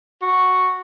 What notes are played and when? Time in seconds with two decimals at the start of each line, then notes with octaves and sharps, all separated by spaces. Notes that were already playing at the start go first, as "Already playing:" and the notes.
0.22 F#4